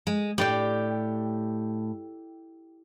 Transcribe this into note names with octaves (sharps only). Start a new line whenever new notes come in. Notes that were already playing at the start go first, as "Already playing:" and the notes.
G#3
A2 G4 D5 G5